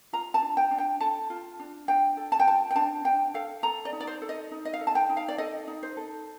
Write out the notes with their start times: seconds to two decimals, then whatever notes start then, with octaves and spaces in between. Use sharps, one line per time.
0.13 F4 A#5
0.34 A5
0.43 D4
0.57 G5
0.71 D4
0.78 G5
1.00 A4 A5
1.30 F4
1.59 D4
1.88 D4 G5
2.17 A4
2.32 A5
2.40 G5
2.47 F4 A5
2.71 G5
2.76 D4 A5
3.04 D4 G5
3.34 A4 F5
3.63 A4 A#5
3.85 D5
3.93 D#4
4.00 D5
4.07 C5
4.22 A4
4.29 D#5
4.51 D#4
4.65 D#5
4.74 F5
4.81 A4
4.87 A5
4.95 G5
5.09 D#4
5.17 F5
5.28 D5
5.38 A4 D#5
5.68 D#4
5.83 C5
5.97 A4